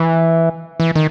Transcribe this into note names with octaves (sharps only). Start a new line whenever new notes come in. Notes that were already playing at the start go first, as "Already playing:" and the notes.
Already playing: E3
E3
D#3